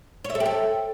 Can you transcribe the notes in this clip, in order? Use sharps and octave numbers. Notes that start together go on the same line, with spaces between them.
C#5
E5
A4
G4
A4